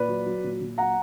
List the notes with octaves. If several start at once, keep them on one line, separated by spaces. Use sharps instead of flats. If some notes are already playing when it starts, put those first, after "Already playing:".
Already playing: A#2 B4 D5
F#3
F#3
A#2
A#2
F#3 F#5 A#5